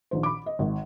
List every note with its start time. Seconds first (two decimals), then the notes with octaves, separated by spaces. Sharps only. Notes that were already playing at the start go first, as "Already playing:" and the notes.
0.11 A#1 D#3 C5
0.23 B5 D6
0.46 D#5
0.59 G#1